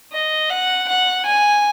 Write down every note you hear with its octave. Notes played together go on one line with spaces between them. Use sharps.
D#5
F#5
F#5
G#5